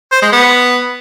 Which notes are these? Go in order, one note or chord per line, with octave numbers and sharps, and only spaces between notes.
C5
G#3
B3